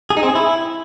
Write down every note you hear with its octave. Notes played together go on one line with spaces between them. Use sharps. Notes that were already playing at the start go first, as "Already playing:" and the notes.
G#4
D#4
C4
G#4
E4